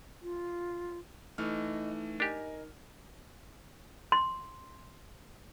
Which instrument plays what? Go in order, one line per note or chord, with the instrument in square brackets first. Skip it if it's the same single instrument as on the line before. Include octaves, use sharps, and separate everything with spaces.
[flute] F4
[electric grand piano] E3 A3 F6 [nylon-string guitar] D#4 [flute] D#5
[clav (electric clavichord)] D4 G4 [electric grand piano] A#4 G#5 [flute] D#5
[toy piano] C6